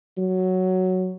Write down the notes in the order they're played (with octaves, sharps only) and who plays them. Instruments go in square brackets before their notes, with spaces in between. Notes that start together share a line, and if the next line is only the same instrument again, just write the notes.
[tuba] F#3